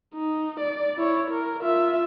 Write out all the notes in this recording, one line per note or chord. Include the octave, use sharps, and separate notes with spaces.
D#4
D5
E4 C#5
A#4
F4 E5